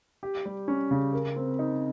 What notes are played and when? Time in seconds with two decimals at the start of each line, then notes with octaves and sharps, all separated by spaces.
0.23 G4
0.45 G3
0.68 C#4
0.91 C#3
1.13 A#4
1.36 C4
1.59 D#4